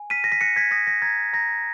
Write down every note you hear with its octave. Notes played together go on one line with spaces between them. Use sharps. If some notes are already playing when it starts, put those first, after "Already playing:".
Already playing: G#5
F6 B6 D#7
A#6
B6
F#6 A#6 C#7
G#6 B6
D#6 A#6
A#6
A#5 G#6
A#5 A#6